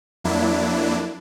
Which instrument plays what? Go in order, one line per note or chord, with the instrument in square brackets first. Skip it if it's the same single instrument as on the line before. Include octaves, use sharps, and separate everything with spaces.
[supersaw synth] F2 F#3 A#3 D4 E4